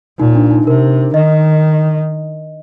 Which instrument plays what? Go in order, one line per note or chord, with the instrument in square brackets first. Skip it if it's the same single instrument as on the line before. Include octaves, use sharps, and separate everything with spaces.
[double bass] A#2 [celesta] D#4
[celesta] D4
D#4
[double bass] C3 [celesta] A#4
[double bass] D#3 [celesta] D#5